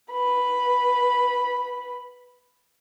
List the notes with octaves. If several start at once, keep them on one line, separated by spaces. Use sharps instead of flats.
B4 B5